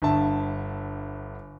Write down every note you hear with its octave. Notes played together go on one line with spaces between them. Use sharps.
G1 G2 E5 A5